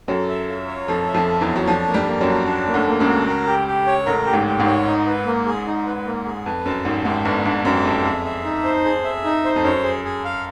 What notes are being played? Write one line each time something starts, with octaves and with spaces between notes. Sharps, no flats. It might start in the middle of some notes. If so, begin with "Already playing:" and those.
F#2 F#3 A4
E5
F4
C#5
F2 F3 A4
E5
F2 F3
F4
E2 E3
C#5
F#3
F2 F3 D4
A#3
G2 G3
A#3
F#2 F#3
F#4
D4
A#3
D2 D3
A#3
C#2 C#3
F#4
A#4
G4
G4
C#5
A1 A2 A#4
G4
G#1 G#2
G4
G#1 G#2
C#5
D#4
B4
A#3
G#4
D#4
B4
A#3
G#4
F2 B4
F#2 A5
G#1 G#2 G4
G#1 G#2 E5
G1 G2 B4
G1 G2 A5
F#2 G4
F2 E5
F2 G#4
E5
D#4
C5
G#4
E5
D#4
C5
F2
F#2 C#5
G#4
G#4
F5